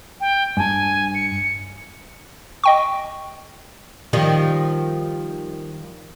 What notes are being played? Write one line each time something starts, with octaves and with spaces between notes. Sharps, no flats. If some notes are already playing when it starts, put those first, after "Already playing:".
G5
G2 G#5 A5
C#7
D#5 G5 C#6
D#3 F3 G3